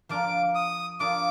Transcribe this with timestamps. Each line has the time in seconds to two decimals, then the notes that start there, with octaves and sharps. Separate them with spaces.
0.09 F3 A#3 D4 F4 A#4 D6
0.55 D#6
1.00 F3 A#3 D4 F4 A#4 D6